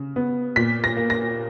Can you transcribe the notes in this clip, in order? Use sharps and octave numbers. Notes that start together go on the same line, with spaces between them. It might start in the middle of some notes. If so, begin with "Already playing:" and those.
Already playing: C#3
B3
A#2 B6
A#6
A#3
A#6